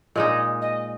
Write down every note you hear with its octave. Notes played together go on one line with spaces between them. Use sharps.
A#2 G#3 D#4 D#5
D#5